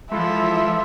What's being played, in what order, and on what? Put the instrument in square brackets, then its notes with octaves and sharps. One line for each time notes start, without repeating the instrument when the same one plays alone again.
[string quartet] E3 F3 [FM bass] G#3 [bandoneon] E4 F4 A4 [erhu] E5